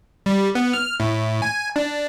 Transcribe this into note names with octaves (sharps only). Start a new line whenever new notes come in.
G3
B3
F6
A2
G#5
D4